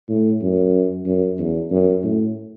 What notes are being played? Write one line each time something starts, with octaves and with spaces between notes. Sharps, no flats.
A2
F#2
F#2
E2
F#2
A2